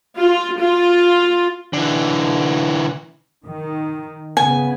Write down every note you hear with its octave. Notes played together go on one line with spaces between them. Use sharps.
F4
F4
D3 E3
D#3
C#3 B3 G#5